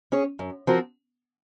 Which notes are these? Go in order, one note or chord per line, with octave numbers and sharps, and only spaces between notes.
C#4 G#4 C#5
F#2
F3 C4 F#4 A#4